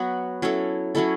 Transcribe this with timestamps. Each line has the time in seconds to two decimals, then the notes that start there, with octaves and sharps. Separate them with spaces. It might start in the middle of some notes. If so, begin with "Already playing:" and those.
Already playing: F#3 B3 F#4 B4
0.42 F#3 C#4 E4 A4
0.95 F#3 C#4 E4 A4